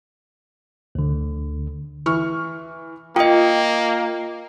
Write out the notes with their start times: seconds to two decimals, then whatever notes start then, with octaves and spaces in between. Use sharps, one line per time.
0.95 D2 D3
2.06 E3 C#6 F6
3.16 A#3 F4 D#5 G5 D#6 C#7